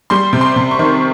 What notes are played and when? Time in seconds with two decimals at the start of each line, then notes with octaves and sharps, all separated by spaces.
0.10 G3 C6
0.33 C3
0.41 C6
0.56 C3
0.71 C#6
0.79 D#3